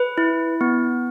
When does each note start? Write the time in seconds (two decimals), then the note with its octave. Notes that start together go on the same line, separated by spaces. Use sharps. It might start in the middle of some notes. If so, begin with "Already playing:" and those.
Already playing: B4
0.18 E4
0.61 B3